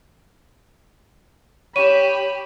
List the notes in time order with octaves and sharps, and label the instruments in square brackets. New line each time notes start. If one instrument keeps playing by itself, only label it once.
[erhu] G4 [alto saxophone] C#5 [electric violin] B5 [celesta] D#7 E7